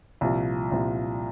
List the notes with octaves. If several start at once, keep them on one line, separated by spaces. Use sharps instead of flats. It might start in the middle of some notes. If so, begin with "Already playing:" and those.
C2 A#2 F3
C2 A#2 F3